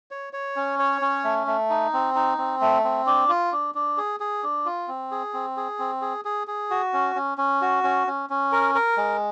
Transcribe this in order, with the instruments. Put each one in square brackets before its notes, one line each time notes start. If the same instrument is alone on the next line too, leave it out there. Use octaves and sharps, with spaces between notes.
[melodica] C#5
C#5
C#4
C#5
C#4
A3
A3
D#4
C4
D#4
C4
A3
C4
D4
F4
D4
D4
G#4
G#4
D4
F4
C4
G#4
C4
G#4
C4
G#4
G#4
G#4
F#4
C#4
C#4
C#4
F#4
C#4
C#4
C#4
A#4
A#4
G#3